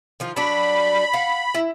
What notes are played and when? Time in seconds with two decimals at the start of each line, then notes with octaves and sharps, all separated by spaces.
0.20 D#3 F3 F4
0.36 F#3 D4 B5
1.14 F5 F#5
1.54 E4